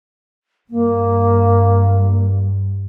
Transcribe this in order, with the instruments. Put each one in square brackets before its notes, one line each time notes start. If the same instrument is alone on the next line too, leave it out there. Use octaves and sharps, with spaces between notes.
[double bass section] G2 [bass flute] A#3